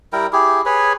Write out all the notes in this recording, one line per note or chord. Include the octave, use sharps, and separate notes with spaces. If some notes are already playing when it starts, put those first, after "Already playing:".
G3 E4 A#4 G5
E4 G4 G#4
G#4 B4 C#5